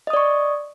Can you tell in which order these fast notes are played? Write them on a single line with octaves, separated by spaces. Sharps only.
D#5 D#6 D5 C#6